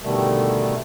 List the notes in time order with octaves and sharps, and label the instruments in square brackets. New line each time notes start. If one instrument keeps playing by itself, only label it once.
[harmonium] G2 B2 D3 D#3 G3 A3